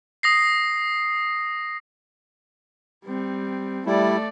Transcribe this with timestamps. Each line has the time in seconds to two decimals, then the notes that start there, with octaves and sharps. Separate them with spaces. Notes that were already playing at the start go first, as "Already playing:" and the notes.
0.23 D#6 A#6 C7
3.05 G3 C4
3.86 G3 A3 E4 D5